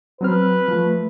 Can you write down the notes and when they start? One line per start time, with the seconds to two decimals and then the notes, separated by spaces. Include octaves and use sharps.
0.21 F#3 C4 B4 F6
0.68 F3 A3